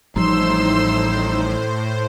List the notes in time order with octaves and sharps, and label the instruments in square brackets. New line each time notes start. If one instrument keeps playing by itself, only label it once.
[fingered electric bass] A1 F3 G3 [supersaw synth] A2 C5 [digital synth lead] D#4 [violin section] C6 E6